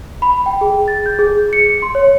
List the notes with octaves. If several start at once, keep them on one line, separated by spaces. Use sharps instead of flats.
B5
G5
G#4
A6
G6
G#4
C#7
C6
C#5